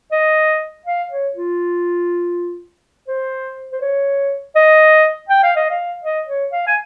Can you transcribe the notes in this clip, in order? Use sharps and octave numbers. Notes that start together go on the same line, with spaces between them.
D#5
F5
C#5
F4
C5
C5
C#5
D#5
G5
F5
D#5
F5
D#5
C#5
F5
G#5